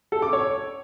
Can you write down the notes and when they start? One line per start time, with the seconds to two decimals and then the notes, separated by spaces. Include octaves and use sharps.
0.12 A4
0.22 D6
0.33 C#5